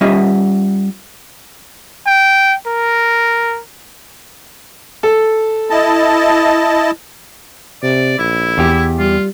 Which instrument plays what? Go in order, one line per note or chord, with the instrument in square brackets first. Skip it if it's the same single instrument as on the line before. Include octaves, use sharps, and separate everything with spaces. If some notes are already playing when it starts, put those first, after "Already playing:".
[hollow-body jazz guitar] G3 C#4 F4 D#5 E5
[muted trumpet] G5
A#4
[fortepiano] A4
[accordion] E4 D#5 A5
[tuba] C3 [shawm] D5
[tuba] A#1 [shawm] E4
[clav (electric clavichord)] E2 G4
[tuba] G3 [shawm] F4